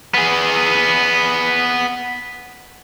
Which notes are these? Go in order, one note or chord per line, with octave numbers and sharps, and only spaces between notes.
B3 G#4